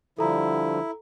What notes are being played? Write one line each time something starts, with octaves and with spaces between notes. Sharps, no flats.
G2 D3 F3 E4 A4 A#5